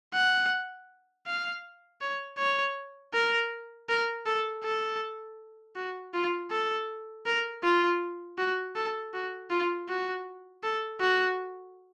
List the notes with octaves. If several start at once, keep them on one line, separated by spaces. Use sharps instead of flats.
F#5
F5
C#5
C#5
A#4
A#4
A4
A4
F#4
F4
A4
A#4
F4
F#4
A4
F#4
F4
F#4
A4
F#4